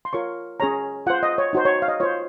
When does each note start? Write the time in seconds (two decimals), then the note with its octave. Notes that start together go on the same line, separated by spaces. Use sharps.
0.05 C6
0.13 F4 A#4 C#5 C#6
0.60 C#4 G#4 C#5 A#5
1.07 F4 C5 F#5
1.23 D#5
1.38 C#5
1.53 D#4 F#4 C5
1.65 C#5
1.82 F5
1.88 D#5
2.00 F4 C5 C#5